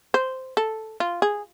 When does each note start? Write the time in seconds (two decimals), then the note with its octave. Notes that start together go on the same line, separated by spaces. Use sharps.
0.14 C5
0.57 A4
1.00 F4
1.22 G#4